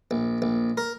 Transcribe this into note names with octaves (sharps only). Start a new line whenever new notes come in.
A#1
A#1
A#4